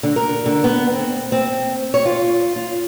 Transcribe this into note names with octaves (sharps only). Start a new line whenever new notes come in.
D3
A#4
D3
B3
C4
C4
C#5
F4
F4